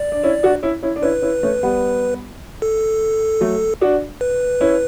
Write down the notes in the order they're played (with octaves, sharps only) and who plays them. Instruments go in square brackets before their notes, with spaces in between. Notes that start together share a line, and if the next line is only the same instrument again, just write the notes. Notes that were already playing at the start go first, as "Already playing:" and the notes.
Already playing: [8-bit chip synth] D5
[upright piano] D4
C#4 E4
D4 F#4
C#4 E4
C#4 E4
D4
[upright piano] C#4 E4 [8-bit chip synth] B4
[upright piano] C#4 E4
A3 C#4
G3 B3
[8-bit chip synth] A4
[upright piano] F#3 A3
D4 F#4
[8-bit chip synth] B4
[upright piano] C#4 E4